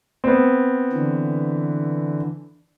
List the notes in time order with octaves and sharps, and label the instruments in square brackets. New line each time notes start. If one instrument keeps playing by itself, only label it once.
[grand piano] B3 C4
[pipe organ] D3 E3